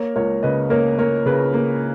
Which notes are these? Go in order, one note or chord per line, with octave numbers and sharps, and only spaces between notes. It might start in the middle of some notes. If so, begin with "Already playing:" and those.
Already playing: A#3 A#4 C#5
C#2 A#4 C#5
C#3 B4 D#5
A#3 A#4 C#5
A#3 A#4 C#5
C#3 G#4 B4
A#3